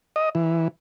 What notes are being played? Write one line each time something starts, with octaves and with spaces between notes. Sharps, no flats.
D#5
E3